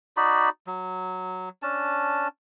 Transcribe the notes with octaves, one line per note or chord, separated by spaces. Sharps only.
D#4 F#4 D5 B5
F#3
C#4 D4 A5